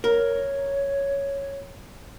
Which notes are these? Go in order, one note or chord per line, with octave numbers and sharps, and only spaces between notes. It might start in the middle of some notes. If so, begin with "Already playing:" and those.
A#4 C#5